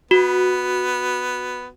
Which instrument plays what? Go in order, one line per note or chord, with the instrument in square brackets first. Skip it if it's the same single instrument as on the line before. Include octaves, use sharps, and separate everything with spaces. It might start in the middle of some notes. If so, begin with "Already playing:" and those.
[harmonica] B3 [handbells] F#4